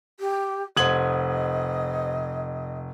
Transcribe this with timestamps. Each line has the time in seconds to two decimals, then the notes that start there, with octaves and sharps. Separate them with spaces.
0.19 G4
0.77 F1 C5 D#5 F#5 D#6 G#6 F#7